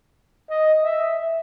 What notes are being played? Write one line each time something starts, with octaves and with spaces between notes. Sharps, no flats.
D#5
E5